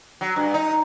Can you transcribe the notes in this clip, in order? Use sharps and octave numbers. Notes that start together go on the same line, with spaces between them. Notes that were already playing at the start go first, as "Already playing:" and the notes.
F#3
G2
D#4